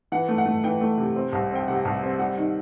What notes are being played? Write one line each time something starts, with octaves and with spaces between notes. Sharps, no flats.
E3 F#5
A3
F#5
A3
E3 G5
A3
C3
C4
C2
C4 G5
C3 F#5
C2
C4
G3 F#5
D#3